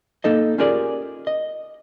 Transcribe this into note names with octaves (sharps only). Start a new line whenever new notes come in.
A#3 D#4 A4 D#5
C#4 F4 G4 G#4 A#4 D5
D#5